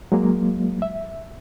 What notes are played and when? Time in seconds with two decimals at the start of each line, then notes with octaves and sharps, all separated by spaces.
0.12 F#3 G#3 A#3
0.82 E5